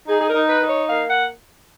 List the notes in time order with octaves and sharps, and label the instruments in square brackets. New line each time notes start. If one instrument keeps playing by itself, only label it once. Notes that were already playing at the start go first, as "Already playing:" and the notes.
[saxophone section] D#4 G#4
G#4
A#4
D#4
B4
D#4
C#5
A#3 F5
F#5